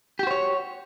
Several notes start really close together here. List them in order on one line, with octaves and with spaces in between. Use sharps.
G4 F#4 C5 C#5